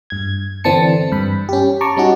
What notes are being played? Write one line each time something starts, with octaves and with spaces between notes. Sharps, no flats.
G2 G#6
D3 E3 C4 D4 A5 C#7
G2 B5
C#4 G4
A5 A#5 C#6 D6
G3 C#4 D#4 F#4